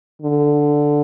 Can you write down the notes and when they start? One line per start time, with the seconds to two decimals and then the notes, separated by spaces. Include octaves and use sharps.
0.22 D3